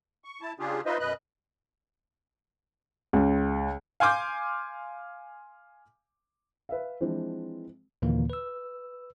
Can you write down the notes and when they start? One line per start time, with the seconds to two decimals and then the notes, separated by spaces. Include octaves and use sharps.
0.24 C#6
0.41 E4 A5
0.60 C#3 D4 F4 G4 G#4
0.86 D#4 F4 B4 C5 D#5 E5
1.00 F#2 B2 B4 D#5 F#6
3.13 C#2
4.00 F5 G#5 C6 D6 G6
6.69 B4 E5 F5
7.00 E3 F3 G#3 C4 D4 F4
8.02 D#2 A#2 D3 E3 A#3
8.30 B4 E6